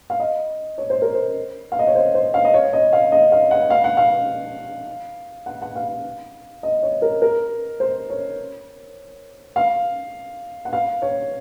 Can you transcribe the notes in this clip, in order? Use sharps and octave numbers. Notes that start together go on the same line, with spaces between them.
F5
D#5
C#5
C5
A#4
C5
F5
D#5
C#5
C5
C5
F5
D#5
C#5
D#5
F5
D#5
F5
F#5
F5
F#5
F5
F#5
F#5
F5
D#5
C#5
A#4
A#4
C5
C#5
F5
F#5
F5
C#5